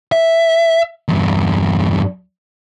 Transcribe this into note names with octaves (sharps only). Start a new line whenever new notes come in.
E5
E2 G2